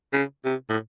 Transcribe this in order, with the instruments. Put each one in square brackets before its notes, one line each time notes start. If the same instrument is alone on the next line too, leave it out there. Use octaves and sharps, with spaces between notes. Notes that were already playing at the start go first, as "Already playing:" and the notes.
[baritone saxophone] C#3
C3
A2